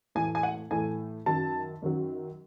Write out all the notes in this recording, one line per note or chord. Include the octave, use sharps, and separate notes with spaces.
A2 E3 A3 G#5
G#5
F#5
A2 E3 A3 G#5
F#2 D#3 F#3 A5
F#2 D#3 F#3